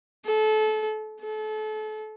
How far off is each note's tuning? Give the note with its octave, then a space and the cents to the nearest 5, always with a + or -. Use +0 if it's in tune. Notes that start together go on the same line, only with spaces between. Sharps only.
A4 -30
A4 -35